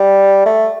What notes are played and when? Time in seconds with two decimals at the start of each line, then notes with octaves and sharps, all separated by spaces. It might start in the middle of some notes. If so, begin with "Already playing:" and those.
Already playing: G3
0.46 A3